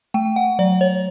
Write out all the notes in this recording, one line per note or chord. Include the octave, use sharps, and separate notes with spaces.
A3 G5
F#5
F#3 D5
C#5